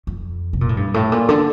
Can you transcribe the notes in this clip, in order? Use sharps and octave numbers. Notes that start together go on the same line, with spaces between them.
F2
C3
A#2
A2
G2
A2
A#2
D3